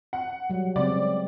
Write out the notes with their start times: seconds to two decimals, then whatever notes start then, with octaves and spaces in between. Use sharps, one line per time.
0.13 F#5
0.50 F#3 G3
0.76 C#3 G#3 C4 D5